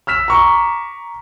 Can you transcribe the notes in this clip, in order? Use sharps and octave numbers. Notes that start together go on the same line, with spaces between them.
E6 F6 B6 E7
A#5 C#6 D6